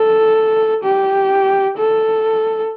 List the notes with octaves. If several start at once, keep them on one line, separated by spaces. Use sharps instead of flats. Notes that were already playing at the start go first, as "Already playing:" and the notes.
Already playing: A4
G4
A4